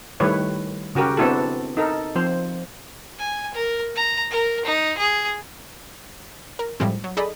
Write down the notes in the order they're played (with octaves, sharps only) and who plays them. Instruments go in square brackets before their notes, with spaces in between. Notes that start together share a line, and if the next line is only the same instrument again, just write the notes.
[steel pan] D#3 G3 A3 E4 B4 C#5
C#3 F#4 G4 A#4
B3 C4 D4 E4 F#4 A4
D#4 A4 A#4
F3 C4 C5
[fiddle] G#5
A#4
A#5
A#4
D#4
G#4
[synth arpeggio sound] A#4
F#2 A2 F3 G3 G#3 C4
F#3
D#4 G#4 A4 D5 D#5 B5